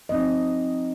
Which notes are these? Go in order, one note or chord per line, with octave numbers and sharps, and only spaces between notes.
F3 C4 D#4 D#5